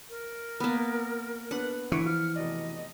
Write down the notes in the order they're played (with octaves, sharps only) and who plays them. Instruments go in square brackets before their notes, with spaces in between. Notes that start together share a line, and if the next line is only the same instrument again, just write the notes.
[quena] A#4
[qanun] A#3 B3
[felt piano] B3 D4 B4 [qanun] F#5
[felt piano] D3 C#7 D7 [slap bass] E3 [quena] C#6
[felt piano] F3 [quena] F6
[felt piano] F1 B2 D5 [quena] D#5